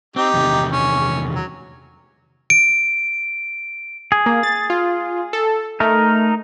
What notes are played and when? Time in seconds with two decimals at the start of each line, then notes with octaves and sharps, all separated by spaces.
0.16 C4 D#4 G4
0.34 E2 C3 D#3
0.72 C#4
1.35 F#3
2.50 D7
4.12 G#4
4.26 A#3
4.43 A6
4.70 F4
5.33 A4
5.80 A3 D#4 A#4